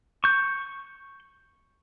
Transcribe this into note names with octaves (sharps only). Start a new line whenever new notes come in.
C#6 G6